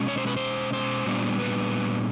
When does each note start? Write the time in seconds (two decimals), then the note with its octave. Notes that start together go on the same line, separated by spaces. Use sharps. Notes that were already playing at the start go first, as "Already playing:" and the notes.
Already playing: B2 G#3 C#4
0.08 C#5
0.18 C5
0.27 B4
0.36 C5
0.73 C5
1.06 A#2 G3 B3 D4
1.39 B4